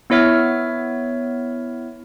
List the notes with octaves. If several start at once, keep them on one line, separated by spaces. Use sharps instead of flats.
B3 E4 C#5 E5 F6